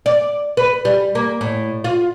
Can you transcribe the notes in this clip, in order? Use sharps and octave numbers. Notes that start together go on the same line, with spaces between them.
D5
B4
G3
A#3
A2
F4